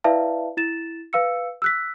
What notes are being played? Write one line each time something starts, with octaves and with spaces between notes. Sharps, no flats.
E4 B4 D5 E5 F5 A5
E4 A6 E7
B4 F5 E6 C#7
E6 F#6 B6